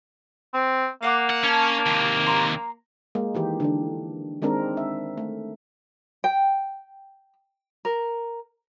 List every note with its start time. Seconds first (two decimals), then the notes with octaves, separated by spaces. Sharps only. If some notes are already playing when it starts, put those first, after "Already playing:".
0.54 C4
1.03 A#3 F5 F#5 D6
1.30 F#5
1.43 C#4 A5 C#6
1.86 D#2 C3
2.26 A#5 C6
3.15 G#3 A#3
3.35 D#3 E3 G4
3.60 D3 E3 D4
4.42 D#3 G#3 C4 D4 A#4
4.77 E5
5.17 A3
6.24 G5
7.85 A#4